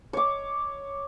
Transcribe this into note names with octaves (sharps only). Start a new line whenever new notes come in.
C#5 D6